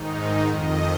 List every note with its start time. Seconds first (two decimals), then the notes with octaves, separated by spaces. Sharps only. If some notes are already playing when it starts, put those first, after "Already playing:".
Already playing: G#2 D#3 D#4
0.47 F2 D#3 D#5